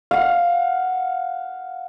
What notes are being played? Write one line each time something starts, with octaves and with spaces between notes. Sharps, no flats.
F5 F#5